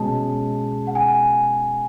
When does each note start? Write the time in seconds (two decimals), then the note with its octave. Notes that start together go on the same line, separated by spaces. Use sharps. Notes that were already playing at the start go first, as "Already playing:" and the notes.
Already playing: B2 G#3 C#4 G#4 A5
0.87 F#5
0.95 G#5